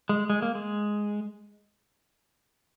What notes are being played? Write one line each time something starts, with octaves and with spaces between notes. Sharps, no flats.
G#3
G#3
A#3
G#3